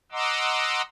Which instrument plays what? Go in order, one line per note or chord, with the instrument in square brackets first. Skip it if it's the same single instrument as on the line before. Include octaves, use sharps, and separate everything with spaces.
[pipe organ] D#5 F#5 A#5 C6 D6 E6